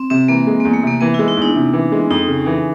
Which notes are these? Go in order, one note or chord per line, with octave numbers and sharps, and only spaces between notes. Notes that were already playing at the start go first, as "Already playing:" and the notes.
Already playing: C4
C3 C4
E3 A#3
G#3
A#3
E2
A3
C3 A#3
E3 B3
E4
G#3
D#4
E2 D4
C3
E3
G#3
F2 D#4
C#3
E3